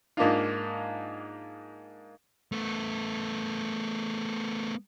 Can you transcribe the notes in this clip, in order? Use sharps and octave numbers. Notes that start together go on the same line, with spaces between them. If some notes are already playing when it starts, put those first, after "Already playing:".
G#2 A#3 D4 D#4 F4
A3 B3